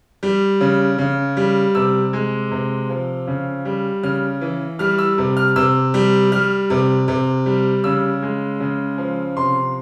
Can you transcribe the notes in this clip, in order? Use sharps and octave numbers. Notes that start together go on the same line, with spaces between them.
G3
C#3
C#3
G3
C3 E6
G#3
C3
F3
C#3
G3
C#3 F6
E3
G3 F6
E6
C3
F6
C3 E6
G3
G3 F6
C3
C3
G3
C#3 E6
G#3
C#3
F3
C3 C6